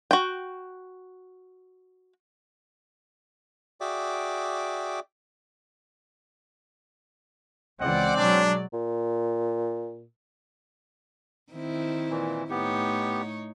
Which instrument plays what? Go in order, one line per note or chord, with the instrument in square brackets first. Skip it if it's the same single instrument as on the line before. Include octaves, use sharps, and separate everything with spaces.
[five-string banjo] F#4 G5
[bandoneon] F#4 G#4 D5 E5 G5 D6
[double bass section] C#2 E3 [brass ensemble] G#3 D5 [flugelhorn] C4 [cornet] F#5
[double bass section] B2 F#3 [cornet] D4
[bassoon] A#2
[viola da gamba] D#3 C4 E4
[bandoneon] A#2 E3
[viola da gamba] A2 D#4 C#5 [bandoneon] B3 G4